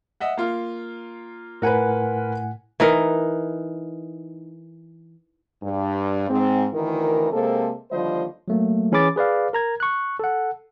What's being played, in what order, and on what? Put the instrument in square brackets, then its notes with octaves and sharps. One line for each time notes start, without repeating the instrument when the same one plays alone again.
[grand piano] D#5 E5 F#5
A#3 F4
[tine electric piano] A2 F#5 G#5 [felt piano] A#4 B4
[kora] E3 D#4 A#4
[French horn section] G2
G#2 C4
D2 D#3 E3 E4 A#4
C3 G#3 A#3 C4 A4
D#2 D3 F3 G3 C5 D#5
[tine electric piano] F#3 A3 A#3
E3 C#4 G#4 B5 D6 A6
G#4 B4 D5 F5
A#4 A#5 G#6
C#6 F#6
A4 F#5